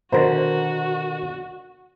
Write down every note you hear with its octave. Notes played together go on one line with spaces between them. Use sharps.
B2 D3 D#3 F#4 A#4 C5